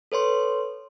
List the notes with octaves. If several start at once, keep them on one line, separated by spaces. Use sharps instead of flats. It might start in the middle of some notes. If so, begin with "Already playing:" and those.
A4 B4 C#5 C6